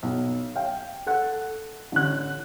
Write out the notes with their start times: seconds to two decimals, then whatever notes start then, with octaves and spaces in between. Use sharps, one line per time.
0.03 B1
0.56 F5 G5
1.07 A4 F#5
1.92 A1 D3 F#6